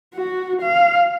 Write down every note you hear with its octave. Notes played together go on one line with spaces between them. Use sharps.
F#4
F5